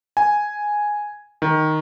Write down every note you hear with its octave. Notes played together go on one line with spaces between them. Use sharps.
G#5
D#3